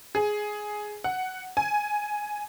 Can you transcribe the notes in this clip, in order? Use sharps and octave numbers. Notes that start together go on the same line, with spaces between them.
G#4
F#5
G#5